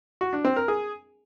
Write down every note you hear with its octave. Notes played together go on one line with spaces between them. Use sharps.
F#4
D4
C4
A#4
G#4